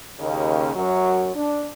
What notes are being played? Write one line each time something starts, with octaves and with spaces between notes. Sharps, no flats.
D#2 C#3
F#2 F#3
D4